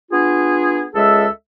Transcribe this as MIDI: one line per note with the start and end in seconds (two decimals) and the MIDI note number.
0.12 0.82 59
0.12 0.82 62
0.12 0.82 65
0.12 0.82 68
0.94 1.26 37
0.94 1.26 56
0.94 1.26 68
0.94 1.26 69
0.94 1.26 76